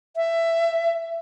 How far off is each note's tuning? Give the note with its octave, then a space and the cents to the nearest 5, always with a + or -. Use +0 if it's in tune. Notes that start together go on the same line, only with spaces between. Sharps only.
E5 +15